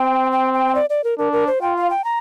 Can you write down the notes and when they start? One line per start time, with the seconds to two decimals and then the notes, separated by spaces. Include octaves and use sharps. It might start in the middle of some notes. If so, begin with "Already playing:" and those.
Already playing: C4 G5
0.32 G5
0.54 G5
0.75 D5
0.90 D5
1.04 A#4
1.18 D4 A#4
1.33 A#4
1.47 C5
1.62 F4 G5
1.76 F5
1.90 G5
2.04 A#5